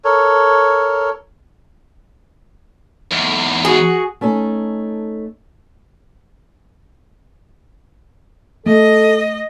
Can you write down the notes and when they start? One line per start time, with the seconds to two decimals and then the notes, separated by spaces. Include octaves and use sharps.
0.04 A4 A#4 C#5
3.12 E2 G#2
3.65 F#4 G#4
4.21 A3 C#4 D#4 A4
8.66 A3 A4 D#5